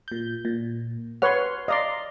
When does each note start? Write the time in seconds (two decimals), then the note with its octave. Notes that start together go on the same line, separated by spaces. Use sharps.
0.08 A#2 G6
0.45 A#2
1.22 B4 C#5 F#5 C6 F6
1.68 D5 D#5 F5 A#5 C6